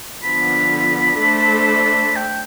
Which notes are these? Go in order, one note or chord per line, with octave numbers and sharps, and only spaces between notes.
D3 F3 B3 B5
A3 D4 A4 C5
B5
G5